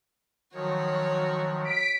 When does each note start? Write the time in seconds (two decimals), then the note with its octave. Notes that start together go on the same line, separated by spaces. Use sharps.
0.54 D#3 F3 F#3 F#4 C#5
1.64 B6 D7